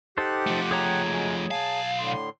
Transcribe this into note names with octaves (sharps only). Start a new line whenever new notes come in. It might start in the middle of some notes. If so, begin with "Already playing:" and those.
D#4 G4 A4 C5 F#5
F3 A3
G#4 C#5 A#5
F#3 G#3
B1 F5 G#5 A5
A2 D3 C6